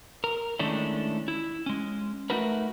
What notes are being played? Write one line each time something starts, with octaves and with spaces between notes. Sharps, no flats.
A#4
D#3 G#3 A3 C#4 D4 E4
E4
G#3 C#4
A3 D#4 F#4 A#4 B4